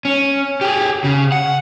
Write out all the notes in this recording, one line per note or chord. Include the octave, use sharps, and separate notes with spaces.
C#4
G4 G#4
C#3
F#5